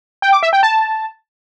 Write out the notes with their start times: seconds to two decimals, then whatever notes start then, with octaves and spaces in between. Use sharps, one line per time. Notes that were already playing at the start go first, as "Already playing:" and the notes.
0.22 G5
0.32 D6
0.43 E5
0.53 G5
0.63 A5